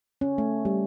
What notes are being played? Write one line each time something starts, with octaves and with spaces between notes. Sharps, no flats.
C#4
A3
G3